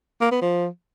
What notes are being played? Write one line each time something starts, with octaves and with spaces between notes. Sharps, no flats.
A#3
B3
F3